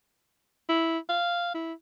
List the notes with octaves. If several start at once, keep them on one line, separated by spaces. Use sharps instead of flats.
E4
F5
E4